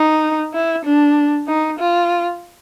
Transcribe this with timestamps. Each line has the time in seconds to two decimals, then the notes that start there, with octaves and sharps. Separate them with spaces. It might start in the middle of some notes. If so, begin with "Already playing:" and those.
Already playing: D#4
0.54 E4
0.85 D4
1.48 D#4
1.79 F4